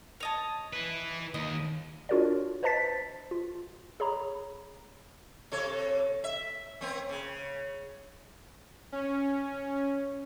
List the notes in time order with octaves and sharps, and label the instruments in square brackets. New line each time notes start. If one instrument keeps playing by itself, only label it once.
[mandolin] C#5 D#5 A5
[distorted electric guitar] E4 B4
[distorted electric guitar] D#2 [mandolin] D#5
[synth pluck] D4 F4 F#4 A#4 C#5 D5
B4 C5 D#5 A5 A6 B6
F4
G#4 C#5 A#5 B5
[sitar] C3 A4 C#5
E5
A#3 C4 C#4
C#3
[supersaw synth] C#4